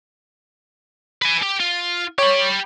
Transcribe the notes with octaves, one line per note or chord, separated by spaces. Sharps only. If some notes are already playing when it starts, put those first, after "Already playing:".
B4 G#5
G4
F4
G4 C#5 B5